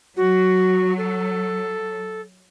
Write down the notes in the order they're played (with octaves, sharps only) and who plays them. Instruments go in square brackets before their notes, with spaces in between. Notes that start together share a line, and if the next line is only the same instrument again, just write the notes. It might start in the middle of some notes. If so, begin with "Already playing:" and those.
[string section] F#3 [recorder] F#4
[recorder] A4